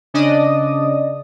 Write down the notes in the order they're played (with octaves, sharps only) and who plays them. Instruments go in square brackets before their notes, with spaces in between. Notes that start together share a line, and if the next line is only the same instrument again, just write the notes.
[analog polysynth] C#3 D4 D5 D#5 D#6